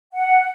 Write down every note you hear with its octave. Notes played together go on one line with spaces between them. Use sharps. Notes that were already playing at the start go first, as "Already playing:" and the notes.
F#5